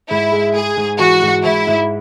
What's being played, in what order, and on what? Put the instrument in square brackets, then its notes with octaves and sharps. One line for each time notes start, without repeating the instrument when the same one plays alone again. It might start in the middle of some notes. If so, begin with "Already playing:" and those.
[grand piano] G#2 [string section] E4
[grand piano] G#3
[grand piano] G#3 [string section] G#4
[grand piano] G#2
[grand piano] E3 [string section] F#4
[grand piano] G#2
[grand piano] G#2 [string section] E4
[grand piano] G#2